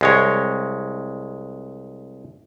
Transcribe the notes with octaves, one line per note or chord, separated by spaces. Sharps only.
C2 G#3 C#5